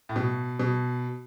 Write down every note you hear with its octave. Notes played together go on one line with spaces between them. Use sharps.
A2
B2
B2